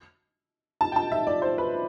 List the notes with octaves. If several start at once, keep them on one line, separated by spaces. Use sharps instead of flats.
A5
G5
A5
E5
D5
C5
B4